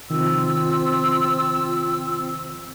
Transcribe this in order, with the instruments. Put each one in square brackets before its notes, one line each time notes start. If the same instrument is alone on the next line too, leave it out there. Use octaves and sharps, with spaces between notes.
[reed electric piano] C3 D#3 F3 [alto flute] C4 [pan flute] F4 [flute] E6